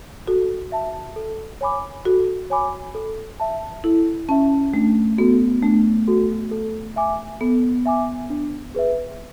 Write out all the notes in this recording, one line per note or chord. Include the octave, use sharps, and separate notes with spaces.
F#4 A4
E5 A5
A4
C#5 G#5 B5 D6
F#4 A4
C#5 G#5 B5 D6
A4
E5 A5
E4 A4
C#4 E5 A5
A3 D4
B3 F#4 A4
A3 D4
F#4 A4
A4
E5 G#5 D6
B3 A4
E5 G#5 D6
D4
G#4 B4 E5